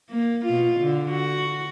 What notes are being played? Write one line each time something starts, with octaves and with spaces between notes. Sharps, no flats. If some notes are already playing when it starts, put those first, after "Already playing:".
A#3
B2 F4
D3
F#4